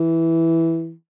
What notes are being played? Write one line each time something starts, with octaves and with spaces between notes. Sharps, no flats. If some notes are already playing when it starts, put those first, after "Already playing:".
Already playing: E3